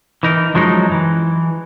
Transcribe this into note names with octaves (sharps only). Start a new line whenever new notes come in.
E3 D#4 A#4
F#2 F3 F#3 G#3 C#4 D#4
E3